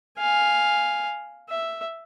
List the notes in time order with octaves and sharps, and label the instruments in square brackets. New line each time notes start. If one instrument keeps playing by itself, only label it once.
[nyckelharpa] F5 G#5
E5